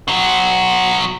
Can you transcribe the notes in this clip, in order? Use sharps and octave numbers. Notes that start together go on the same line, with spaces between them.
B2 F#3